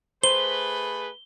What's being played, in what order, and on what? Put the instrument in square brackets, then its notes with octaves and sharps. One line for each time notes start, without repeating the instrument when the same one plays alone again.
[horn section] A3 G#4 B4 [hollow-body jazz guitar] C5 [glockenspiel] G7